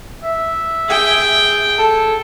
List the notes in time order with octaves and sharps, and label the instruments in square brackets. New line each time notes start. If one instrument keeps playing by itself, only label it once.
[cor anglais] E5
[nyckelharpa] G#4 G5
[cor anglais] A4